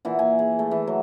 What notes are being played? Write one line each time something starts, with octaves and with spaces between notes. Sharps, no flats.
A#2 E3 F#5
G#5
G#4
A3
E3
F#3